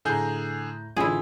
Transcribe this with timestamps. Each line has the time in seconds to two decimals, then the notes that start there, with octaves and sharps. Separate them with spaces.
0.05 A2 D3 G#4 A#5 G6
0.97 A1 D3 E4 F4 G#4